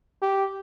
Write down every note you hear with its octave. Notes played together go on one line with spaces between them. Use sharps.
G4